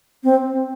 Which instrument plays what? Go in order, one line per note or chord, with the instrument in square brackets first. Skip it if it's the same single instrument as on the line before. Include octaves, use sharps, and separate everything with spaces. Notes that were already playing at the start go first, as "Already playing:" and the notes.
[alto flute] C4